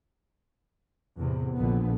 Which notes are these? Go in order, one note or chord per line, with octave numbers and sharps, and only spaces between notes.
E2 A2 C3
A#1 D3 B3